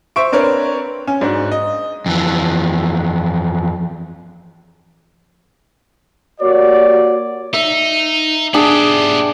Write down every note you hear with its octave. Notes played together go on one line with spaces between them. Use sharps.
C5 E5 C#6 D7
C4 D4 A#4 B4 C#5
C#4
G#2 D4 F#4
D#5
F2 E3
A#3 F#4 G4 C#5 D5
D#4 E5
B3 D4 G4 G#4